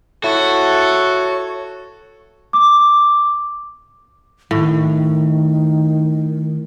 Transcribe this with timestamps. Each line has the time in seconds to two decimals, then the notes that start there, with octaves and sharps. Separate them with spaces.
0.24 E4 F#4 A4 C#5
2.53 D6
4.51 A2 D#3